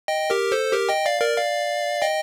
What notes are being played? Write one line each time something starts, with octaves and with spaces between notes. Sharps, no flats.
D#5 G5
G4 A#4
A4 C5
G4 A#4
D#5 G5
D5 F5
A#4 D5
D5 F5
D#5 G5